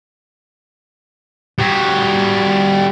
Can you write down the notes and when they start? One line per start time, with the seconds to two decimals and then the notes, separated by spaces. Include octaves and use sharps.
1.59 G3 F#4